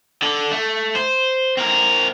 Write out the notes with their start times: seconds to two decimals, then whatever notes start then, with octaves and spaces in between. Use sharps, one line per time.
0.22 D3 A4
0.51 A3
0.95 C5
1.57 C4 A#4